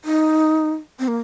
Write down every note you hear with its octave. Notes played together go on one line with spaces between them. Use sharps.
D#4
C4
A#3